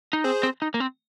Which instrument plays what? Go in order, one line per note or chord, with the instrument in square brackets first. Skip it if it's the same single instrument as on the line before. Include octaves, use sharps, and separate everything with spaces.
[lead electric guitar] D#4
[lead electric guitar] C4 [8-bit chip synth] G#4 C5
[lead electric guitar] C4
D#4
A#3
C4